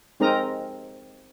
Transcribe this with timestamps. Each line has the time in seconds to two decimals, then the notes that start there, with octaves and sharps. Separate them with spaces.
0.20 G#3 C4 D#4 A#4 D#5 A#5